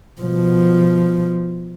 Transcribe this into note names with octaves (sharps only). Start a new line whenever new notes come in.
B2 F3